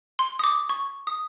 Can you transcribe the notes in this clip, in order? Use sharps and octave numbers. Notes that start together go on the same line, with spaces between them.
C6
D#6
D6
C#6
D#6